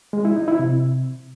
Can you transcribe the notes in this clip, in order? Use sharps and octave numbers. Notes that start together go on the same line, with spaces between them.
G#3
E4
D#4
E4
C3